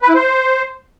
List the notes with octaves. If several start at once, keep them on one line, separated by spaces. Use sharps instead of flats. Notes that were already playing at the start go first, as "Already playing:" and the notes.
B4
E4
C5